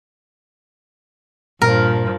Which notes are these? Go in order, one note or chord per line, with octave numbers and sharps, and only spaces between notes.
G2 A#2 F3 A#4